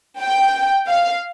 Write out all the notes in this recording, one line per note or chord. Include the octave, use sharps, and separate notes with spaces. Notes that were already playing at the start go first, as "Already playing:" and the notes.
G5
F5